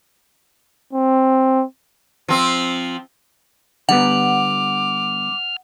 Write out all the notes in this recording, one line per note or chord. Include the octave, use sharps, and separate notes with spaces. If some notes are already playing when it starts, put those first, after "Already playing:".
C4
F3 C4
D3 G3 B3 F#5 D6 F6